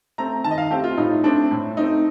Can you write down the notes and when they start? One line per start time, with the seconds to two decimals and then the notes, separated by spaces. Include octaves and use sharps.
0.18 A3 C4 A#5
0.44 D#3 A5
0.51 D#5
0.58 F5
0.70 A3 C4 G4
0.84 F4
0.97 A2 D#4
1.23 A3 C4 D4
1.51 A2
1.77 A3 C4 D#4